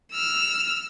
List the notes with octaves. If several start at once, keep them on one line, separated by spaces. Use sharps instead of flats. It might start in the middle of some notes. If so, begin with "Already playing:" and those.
E6 F6